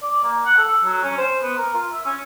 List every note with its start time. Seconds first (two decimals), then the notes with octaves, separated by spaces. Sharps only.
0.02 D5
0.24 A#3
0.45 F#5
0.58 A4
0.85 F#3
1.04 C#4
1.18 C5
1.42 B3
1.58 A#4
1.74 F4
1.92 E5
2.05 C#4